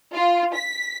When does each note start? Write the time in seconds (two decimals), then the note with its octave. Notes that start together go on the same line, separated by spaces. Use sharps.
0.14 F4
0.54 B6